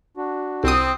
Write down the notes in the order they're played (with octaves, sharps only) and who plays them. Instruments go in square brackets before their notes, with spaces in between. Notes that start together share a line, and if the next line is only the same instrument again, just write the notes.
[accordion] D4 F#4
[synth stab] C2 D#6 [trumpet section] C4